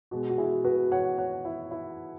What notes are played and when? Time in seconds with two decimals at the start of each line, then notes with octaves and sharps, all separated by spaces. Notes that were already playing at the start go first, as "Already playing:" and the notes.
0.11 B2 G#3 F#4
0.30 F#4
0.38 E4 G#4
0.64 F#4 B4
0.92 C#5 F#5
1.18 C#5 F#5
1.45 E4
1.71 E4